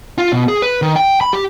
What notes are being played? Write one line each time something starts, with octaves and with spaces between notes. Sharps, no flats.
F4
B2
G#4
B4
D#3
G5
B5
G4